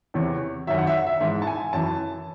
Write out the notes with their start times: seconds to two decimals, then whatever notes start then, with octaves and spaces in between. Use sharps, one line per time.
0.14 E2 C3 E3 C#5
0.67 F#2 D#3 F#3 E5
0.78 F#5
0.87 E5
0.97 F#5
1.07 E5
1.20 G#2 E3 E5
1.42 A5
1.47 G#5
1.73 F#2 E3 A5